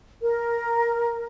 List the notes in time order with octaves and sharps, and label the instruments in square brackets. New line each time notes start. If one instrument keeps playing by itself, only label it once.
[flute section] A#4